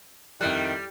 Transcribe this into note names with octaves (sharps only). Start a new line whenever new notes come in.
F2 D#3 G3 E4 F#6